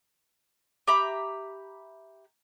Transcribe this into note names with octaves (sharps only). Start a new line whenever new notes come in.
G4 E5 A#5 B5